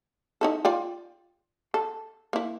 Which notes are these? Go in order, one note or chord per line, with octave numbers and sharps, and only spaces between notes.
D#4 E4 A4
F4 D5 G5
A4
A#3 E4